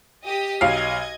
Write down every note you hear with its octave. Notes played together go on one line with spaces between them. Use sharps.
G4 D#5 D#6
B1 D#5 F5 G#6